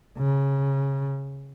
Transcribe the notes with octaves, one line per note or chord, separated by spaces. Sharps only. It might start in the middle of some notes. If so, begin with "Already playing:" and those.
C#3